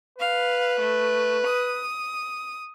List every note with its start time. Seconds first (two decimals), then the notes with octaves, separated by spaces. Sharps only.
0.18 B4 F5
0.79 A3
1.46 D#6